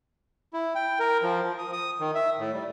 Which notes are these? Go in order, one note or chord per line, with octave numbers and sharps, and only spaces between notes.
E4
G5
A#4
F3
F3
D#6
D#6
D#3
E5
A2
G3